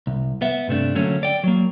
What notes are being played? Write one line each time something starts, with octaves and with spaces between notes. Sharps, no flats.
C2
B3 E5
G2 C3 A3 D4
D3 F#3 A3 A#3 C#4
D5 G5
F#3 A#3